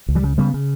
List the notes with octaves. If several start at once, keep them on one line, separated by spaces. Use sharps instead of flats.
C#2
E3 G3
C#3
C#3 G3 B3
C#3